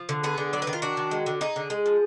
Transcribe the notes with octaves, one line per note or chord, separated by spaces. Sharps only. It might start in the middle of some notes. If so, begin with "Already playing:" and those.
Already playing: F3
D3
B3 G#4
D3
F#3 D5
B4
D#3
F4
D4 F#4
D#3
G#3
D3
D#4 G#4
D3
G#3
F3